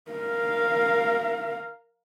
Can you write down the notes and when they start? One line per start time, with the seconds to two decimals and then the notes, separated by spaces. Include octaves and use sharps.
0.11 A#4 F5